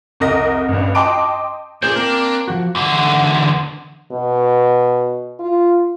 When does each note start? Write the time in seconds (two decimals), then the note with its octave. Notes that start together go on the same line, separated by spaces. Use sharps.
0.20 C2 F2 A#4 D#5 A#6
0.68 A1 G2
0.95 D#5 G5 A5 C6 D6 D7
1.83 A#2 C#4 D4 G#4 C5
1.96 A#3 C4 A#4
2.48 F3 F#4
2.75 E2 D3
4.12 B2
5.40 F4